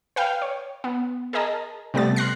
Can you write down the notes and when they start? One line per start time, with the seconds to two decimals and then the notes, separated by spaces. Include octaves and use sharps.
0.16 B4 F5 G5
0.42 C#5
0.84 B3
1.33 G#4 A#4 D#5 A5 A#5
1.94 C3 G3 A3 B3 A6
2.16 C6 F6 F#6 A#6 C7